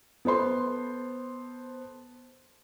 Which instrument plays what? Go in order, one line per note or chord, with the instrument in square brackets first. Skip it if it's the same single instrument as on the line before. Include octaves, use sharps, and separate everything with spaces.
[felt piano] B3 A4 C5 C6